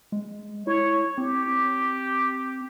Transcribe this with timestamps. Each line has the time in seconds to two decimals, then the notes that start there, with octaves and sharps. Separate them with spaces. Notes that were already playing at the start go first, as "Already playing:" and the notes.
0.12 G#3
0.67 E4 C#5
1.18 C4 G4